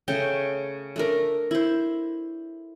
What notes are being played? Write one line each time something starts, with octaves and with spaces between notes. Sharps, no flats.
C#3 A3 G5
A3 D4 A#4
E4 C5